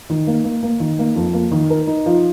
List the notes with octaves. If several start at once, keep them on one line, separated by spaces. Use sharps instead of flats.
D#3
A#3
A#3
A#3
D#3
A#3
F2
A#3
D#3
A#4
D#4
F3